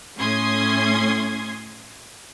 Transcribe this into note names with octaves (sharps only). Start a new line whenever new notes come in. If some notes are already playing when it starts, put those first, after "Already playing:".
A2 C#4 C6 D#6 G#6